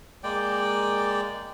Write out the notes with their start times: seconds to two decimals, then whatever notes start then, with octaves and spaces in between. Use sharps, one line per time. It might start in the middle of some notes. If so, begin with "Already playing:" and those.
0.24 G#3 A#3 D5 G5